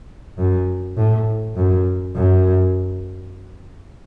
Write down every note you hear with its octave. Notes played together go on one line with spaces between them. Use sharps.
F#2
A2
F#2
F#2